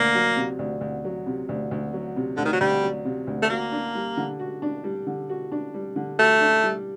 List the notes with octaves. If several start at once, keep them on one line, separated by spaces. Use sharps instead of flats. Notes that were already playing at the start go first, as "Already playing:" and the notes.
Already playing: D2 A#3
F#3
C3
D2
D2
F#3
C3
D2
D2
F#3
C3
D2 D3
D#3
F#3
D2 G3
F#3
C3
D2
A3
A#3 F#4
D4
G3
D3
F#4
D4
G3
D3
F#4
D4
G3
D3
A3 F#4
D4
G3